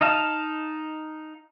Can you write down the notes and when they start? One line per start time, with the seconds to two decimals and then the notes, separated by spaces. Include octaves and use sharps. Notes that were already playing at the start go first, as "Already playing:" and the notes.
0.01 D#4 D#5 F5 A5